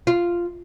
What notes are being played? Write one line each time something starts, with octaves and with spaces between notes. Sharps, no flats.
F4